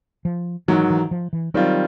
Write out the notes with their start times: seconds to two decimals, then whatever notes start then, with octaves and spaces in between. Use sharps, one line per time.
0.25 F3
0.68 G#2 D#3 E3 F#3
0.90 E3
1.11 F3
1.33 E3
1.54 D#3 F#3 G3 C4 F4